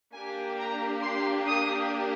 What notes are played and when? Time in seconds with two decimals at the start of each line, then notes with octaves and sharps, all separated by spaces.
0.13 A#3 D4 G4 G#5
0.58 A#5
1.02 C6
1.46 D#6